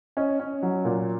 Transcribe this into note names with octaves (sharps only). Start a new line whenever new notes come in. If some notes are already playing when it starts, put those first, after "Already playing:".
C#4 D#5
C#4
F#3
A#2